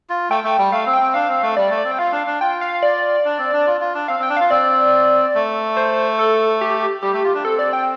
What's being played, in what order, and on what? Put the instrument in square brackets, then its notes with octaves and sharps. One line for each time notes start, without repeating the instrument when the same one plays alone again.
[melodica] F4
[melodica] A3 [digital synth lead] G5
[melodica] A3
G3
[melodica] A3 [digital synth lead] F5
[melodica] C4
[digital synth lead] G5
[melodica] C4
[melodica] D4 [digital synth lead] F5
[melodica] C4
A3
[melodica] G3 [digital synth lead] D5
[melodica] A3
[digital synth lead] D5
[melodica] C4
[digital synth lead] G5
[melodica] F4 [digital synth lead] F5
[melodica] D4
D4
[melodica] F4 [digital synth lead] G5
[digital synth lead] F5
D5
[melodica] D4
C4
D4
F4
F4
D4
[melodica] C4 [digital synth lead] F5
[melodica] C4 [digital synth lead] G5
[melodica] D4
[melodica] F4 [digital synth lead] F5
[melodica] C4 [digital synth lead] D5
[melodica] A3
[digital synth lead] C5
A4
G4
[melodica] G3 [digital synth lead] G4
[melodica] A3
F4
D4
[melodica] C4 [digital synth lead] A4
[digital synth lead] D5
G5